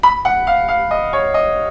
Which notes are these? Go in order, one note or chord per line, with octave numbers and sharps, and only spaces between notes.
B5
F#5
F5
F5
D#5
C#5
D#5